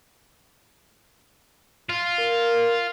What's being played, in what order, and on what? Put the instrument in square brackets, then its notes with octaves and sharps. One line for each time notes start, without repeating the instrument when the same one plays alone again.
[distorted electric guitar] F4
[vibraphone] A#4